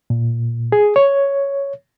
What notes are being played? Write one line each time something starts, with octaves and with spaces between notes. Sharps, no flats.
A#2
G#4
C#5